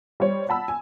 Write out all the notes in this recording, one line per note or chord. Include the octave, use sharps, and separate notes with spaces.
G3 C5 C#5
F#5 A5 B5 E6
G#5